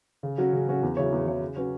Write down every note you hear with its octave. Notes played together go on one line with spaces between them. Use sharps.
C#3
F#3 C#4 F#4
C#3
F#3 C#4 F#4
E2
C#3 F#3 E4 C#5
E2
C#3 F#3 E4 C#5
C#3
F#3 C#4 F#4 B4